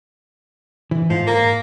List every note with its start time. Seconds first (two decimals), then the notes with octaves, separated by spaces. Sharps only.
0.91 E3
1.10 G#2 F3
1.27 A#3